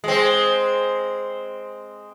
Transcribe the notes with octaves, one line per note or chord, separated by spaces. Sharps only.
G#3 C4